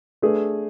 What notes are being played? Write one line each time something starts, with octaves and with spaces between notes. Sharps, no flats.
A3 D4 G#4 B4